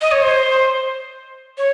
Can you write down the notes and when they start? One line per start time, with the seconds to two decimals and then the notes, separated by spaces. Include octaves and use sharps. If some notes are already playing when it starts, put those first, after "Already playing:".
0.01 D#5
0.12 C#5
0.22 C5
1.58 C#5